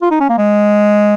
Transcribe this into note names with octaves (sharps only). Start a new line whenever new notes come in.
F4
D#4
C#4
A#3
G#3